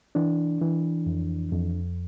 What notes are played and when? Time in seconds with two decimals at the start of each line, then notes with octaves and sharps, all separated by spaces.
0.15 E3 D4
0.61 E3
1.06 F2
1.52 F2